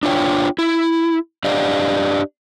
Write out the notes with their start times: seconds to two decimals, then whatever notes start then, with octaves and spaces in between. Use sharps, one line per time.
0.03 D4 F4 C#5 G5
0.59 E4
1.44 D4 G4 D5 D#5 F5